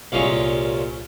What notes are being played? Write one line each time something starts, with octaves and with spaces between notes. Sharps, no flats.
C2 A#2 G#3 C#4 F5